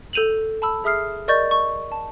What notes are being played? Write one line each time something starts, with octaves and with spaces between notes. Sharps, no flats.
A4 G6 D#7 F7 F#7
A5 B5 E6
G#4 E5 D#6 F6 C7
A#4 D5 D#5 C#6 G6 A6
D#5 C#6
A5